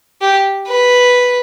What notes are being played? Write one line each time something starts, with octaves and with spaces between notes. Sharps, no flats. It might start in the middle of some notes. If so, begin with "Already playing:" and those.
G4
B4